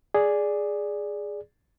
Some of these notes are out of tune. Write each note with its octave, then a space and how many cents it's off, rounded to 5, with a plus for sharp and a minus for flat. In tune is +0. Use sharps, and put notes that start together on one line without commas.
G#4 +0 D5 +0